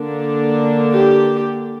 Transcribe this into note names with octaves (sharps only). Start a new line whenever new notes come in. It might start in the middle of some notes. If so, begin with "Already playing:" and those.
Already playing: D3 A#3 D4
G4